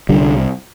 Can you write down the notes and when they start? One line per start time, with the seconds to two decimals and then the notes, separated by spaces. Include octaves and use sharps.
0.09 C2 D3 G3
0.21 D3